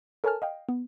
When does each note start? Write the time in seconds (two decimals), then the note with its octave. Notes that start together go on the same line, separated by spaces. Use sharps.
0.24 A4 A#4 C#5 G#5 A5 F6
0.42 D#5 F5 G5
0.69 B3